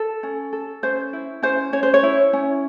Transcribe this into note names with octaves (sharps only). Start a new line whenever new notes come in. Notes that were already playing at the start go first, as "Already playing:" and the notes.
Already playing: A4
C#4
A4
C#4 C5
E4
C#4 C5
C#4 C#5
C5
C#5
E4
C#4